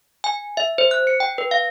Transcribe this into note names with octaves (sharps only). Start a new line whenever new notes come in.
G#5
E5
C5
F#6
C#7
G5
B4
F5